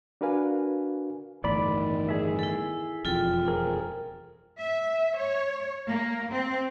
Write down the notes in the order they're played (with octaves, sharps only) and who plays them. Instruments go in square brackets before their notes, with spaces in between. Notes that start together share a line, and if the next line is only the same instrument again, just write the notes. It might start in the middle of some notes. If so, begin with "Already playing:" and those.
[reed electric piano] D4 F#4 A#4 B4 F5 G#5
[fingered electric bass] G1 E2 A2 [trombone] D#3 [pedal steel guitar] D5 B5
[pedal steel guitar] G#4 E5
[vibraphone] E4 A4
[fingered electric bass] E1 F2 [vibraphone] F4 A4 G5
[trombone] F3 [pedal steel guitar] G#4 A#4
[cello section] E5
C#5
A#3
C4